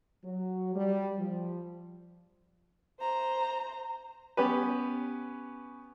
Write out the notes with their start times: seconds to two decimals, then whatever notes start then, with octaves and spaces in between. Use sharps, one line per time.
0.24 F#3
0.75 G3
1.19 F3
3.00 C5 A#5
4.37 B3 C#4 G4 B4